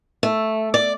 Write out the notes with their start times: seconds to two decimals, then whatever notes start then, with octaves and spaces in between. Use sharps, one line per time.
0.23 A3
0.74 D5